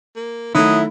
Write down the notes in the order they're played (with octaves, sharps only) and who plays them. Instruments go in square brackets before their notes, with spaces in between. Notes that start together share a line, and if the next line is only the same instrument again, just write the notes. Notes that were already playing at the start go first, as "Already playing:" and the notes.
[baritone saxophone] A#3
[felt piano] D#3 A3 [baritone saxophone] F#3 [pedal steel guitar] E4 [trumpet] D#6